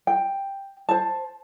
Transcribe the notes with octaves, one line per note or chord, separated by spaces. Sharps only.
G5
C5 A5